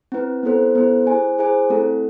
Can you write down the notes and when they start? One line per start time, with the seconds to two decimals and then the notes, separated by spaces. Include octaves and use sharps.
0.12 C4 E4 B4
0.43 B3 E4 A4 C5
0.75 B3 E4 A4 C5
1.07 E4 G#4 C5 G#5
1.38 E4 G#4 C5 G#5
1.70 A3 C4 E4 A4